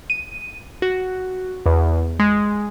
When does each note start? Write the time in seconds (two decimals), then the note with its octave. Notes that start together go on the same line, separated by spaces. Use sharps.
0.10 D#7
0.82 F#4
1.66 E2
2.19 G#3